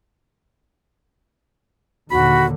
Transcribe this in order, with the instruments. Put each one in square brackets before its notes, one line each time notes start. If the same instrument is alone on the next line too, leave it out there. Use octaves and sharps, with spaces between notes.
[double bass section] D#2 A#2 D3 [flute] F#4 [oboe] B5